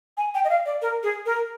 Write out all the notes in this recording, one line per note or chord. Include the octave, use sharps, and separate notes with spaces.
G#5
G5
D#5
F5
D5
A#4
G#4
A#4